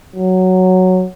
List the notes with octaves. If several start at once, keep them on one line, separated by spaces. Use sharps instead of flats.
F#3